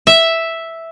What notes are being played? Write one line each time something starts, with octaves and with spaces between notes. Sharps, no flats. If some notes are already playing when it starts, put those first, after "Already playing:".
E5